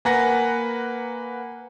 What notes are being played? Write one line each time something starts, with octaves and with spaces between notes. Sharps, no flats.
A#3 B4 F#5 G#5 A#5 A#6